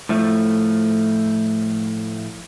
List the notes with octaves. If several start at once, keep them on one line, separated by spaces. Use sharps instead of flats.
A2 F3 A3